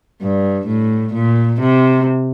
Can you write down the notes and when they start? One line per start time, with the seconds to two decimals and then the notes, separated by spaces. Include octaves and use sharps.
0.22 G2
0.67 A2
1.14 A#2
1.60 C3